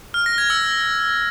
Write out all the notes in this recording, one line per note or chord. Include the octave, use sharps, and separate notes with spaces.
F6
A#6
G#6
E6